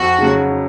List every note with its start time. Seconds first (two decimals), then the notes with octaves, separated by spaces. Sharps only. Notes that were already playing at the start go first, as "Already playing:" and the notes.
Already playing: F2 F#4
0.18 C#3 F#3